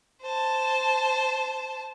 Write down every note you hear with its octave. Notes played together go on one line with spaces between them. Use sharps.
C5 A5